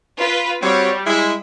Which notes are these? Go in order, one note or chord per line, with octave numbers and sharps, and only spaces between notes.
F4 B4
G3 C4 F#4 C#5
G#3 E4